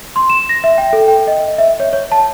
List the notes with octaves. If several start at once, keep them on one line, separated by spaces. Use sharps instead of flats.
C6
E7
A#6
E5
G5
A4
G5
D#5
E5
C#5
C#5
A5